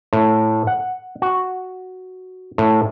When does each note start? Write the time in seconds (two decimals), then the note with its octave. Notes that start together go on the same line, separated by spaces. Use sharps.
0.13 A2
0.67 F#5
1.22 F#4
2.58 A2